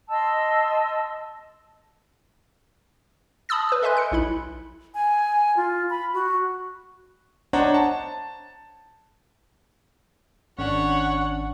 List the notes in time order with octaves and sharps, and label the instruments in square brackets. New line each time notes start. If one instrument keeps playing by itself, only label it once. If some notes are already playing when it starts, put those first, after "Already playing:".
[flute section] D#5 A5 C6 E6
[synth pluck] A5 B5 D#6 E6 A6
B4 E6
A4 D#5 E5 G#5 C6 F#6
F#6 C#7
B1 E4 B5
[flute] G#5
F4
B5
F#4
[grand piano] D4 C5 C#5 D#5 F#5 A#5
A5
[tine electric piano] G#1 [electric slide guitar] C#4 D4 [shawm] C#5 [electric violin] F#5